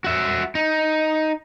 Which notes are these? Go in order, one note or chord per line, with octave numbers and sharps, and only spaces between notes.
F#4 E5
D#4